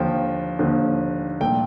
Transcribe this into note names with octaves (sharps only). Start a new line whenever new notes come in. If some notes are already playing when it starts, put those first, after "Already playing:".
Already playing: D#2 D3 F3 G5
D#2 D3 F3
C2 A#2 A3 G5